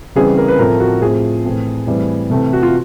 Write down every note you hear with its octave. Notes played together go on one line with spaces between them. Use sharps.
C#3 E3 G3 C4 G#4
A#4
B4
A2 F3 A3 C4 A#4
F#4
A2 F3 A3 C4 G#4
A2 E3 A3 C4
A2 E3 G3 C4
C3 E3 A3 C4
F#4
F4